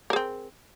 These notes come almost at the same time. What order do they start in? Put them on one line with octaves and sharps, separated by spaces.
A#4 G#4 C4